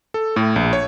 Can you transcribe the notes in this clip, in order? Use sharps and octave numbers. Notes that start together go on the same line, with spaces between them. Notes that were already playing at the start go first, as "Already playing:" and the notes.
A4
A2
A#1
C#5